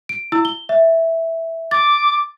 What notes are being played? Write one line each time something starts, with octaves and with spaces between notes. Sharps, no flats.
D7
E4 E6
G7
E5
D6 A6